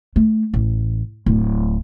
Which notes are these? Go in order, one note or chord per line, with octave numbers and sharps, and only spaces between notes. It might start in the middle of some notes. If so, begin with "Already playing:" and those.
A3
A1
D1